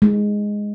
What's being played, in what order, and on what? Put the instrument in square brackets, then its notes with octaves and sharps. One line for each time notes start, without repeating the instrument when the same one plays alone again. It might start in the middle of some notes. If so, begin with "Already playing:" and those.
[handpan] G#3